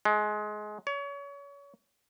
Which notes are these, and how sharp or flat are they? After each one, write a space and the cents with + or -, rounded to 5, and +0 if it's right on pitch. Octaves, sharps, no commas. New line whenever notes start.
G#3 +25
C#5 +30